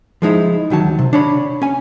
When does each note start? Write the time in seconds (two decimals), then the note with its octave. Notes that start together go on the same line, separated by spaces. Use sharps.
0.22 F3 G#3 D#4 E4
0.70 D2 D#3 F#3 A5
0.99 C3
1.13 D4 C#5 B5
1.62 C#4 G#5